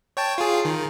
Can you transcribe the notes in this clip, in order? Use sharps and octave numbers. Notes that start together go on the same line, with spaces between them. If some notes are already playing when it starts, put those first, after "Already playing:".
C#5 G5 A5
F4 G#4
D#3